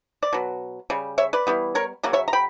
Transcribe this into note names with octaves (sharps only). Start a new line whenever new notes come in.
D5
B2 F#3
C#3 G3
C#5 E5
B4 D5
E3 G3 B3
A#4 C#5
C#3 F#3 A#3 C#4
C#5 E5
A#5
G5 B5